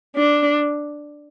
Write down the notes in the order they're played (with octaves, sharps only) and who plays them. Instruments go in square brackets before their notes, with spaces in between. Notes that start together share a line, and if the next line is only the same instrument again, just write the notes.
[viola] D4